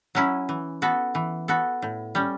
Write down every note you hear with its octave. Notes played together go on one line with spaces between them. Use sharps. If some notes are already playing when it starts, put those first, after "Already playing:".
F#3 C#4 E4
E3
B3 F#4 A4
E3
B3 F#4 A4
A2
G3 C#4